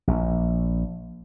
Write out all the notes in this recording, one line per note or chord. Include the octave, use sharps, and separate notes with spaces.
A#1